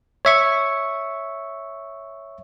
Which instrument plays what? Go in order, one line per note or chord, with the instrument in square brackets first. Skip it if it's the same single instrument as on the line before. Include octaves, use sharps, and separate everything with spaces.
[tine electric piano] C#5 E5 C#6